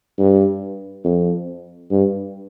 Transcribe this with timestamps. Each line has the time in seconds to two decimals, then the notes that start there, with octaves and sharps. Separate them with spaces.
0.19 G2
1.05 F2
1.91 G2